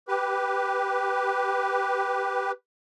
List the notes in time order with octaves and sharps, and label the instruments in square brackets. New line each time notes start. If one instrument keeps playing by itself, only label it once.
[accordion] G4 B4